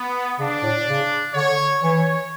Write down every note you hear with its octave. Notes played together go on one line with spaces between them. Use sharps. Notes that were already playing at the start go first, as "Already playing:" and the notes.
Already playing: B3
C#3 D4
A2
C#3
D3 C#5
E3 C#5